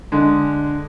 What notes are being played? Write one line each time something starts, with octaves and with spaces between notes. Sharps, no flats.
D3 G#3